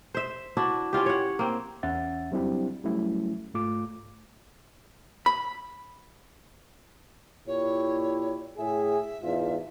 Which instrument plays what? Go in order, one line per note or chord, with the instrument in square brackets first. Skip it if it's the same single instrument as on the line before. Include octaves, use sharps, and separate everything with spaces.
[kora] C5 E5
D4 E4 F#4
C#4 E4 F4 G4
C#5 F#5
A#3 C4
[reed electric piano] E2 C#4 E5 F#5 A6
F#3 G3 C4 D4 E4 G4
F#3 G3 A3 C#4 E4
G#2 A3 F4 D6
[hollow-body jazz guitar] B5
[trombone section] A#2 E4 G4 [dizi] C#5
[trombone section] A2 G#4 [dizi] E5
[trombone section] E2 G#2 F4